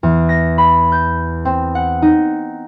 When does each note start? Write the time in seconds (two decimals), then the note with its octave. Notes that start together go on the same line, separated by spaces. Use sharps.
0.03 E2
0.29 A#6
0.58 B5
0.92 G6
1.45 C4
1.75 F#5
2.02 D#4